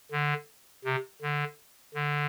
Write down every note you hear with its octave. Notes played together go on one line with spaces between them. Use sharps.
D3
C3
D3
D3